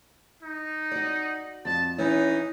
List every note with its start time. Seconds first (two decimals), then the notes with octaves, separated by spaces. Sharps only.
0.42 D#4
0.92 F#4 D5
1.65 F2 A5
1.98 E3 C#4 D#4